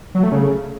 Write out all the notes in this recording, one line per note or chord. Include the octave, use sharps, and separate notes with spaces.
F#3
A3
C#3